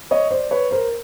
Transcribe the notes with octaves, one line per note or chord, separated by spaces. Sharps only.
C#5 D#5
C5 D5
B4 C#5
A#4 C5